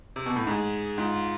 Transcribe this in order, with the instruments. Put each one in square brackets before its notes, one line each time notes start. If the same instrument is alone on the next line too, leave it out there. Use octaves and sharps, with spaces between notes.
[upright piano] C3
B2
A2
[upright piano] G#2 [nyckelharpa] G#4
[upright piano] G#2 [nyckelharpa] F4